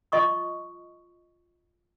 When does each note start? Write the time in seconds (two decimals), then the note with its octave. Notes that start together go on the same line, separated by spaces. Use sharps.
0.12 F4 D#5 C#6 D#6